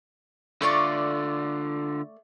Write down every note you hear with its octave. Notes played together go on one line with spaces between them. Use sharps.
D3 A3 F4 D5 C#6